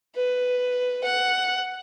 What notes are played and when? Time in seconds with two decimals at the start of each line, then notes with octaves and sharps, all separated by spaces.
0.16 B4
1.04 F#5